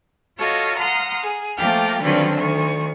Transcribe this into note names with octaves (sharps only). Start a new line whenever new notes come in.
F4 F#4 A4 C#5 D#5 F5
F#5 A#5 C6 D#6 F6
G#4
F3 A3 A#3 G5 D6 F6
G2 D3 D#3 F#3 C4 C#4
D2 D#3 C#6